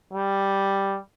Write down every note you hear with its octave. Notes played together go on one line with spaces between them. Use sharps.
G3